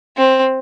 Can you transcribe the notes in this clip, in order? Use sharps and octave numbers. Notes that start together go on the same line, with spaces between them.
C4